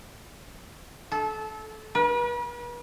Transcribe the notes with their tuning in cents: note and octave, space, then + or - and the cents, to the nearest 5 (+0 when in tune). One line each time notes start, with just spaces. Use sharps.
A4 -25
B4 -40